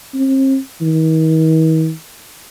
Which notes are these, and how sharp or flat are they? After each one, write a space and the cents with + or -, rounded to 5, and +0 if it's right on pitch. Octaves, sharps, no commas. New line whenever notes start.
C4 +40
D#3 +45